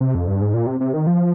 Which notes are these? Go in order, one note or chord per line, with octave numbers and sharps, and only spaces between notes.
C3
F2
G2
G#2
A#2
C3
C3
D#3
F3